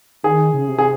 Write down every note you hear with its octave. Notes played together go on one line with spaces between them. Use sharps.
D#3 G#4
C#3
C3
G#4